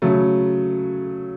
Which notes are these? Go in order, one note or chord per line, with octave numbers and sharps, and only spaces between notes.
C#3 F#3 A3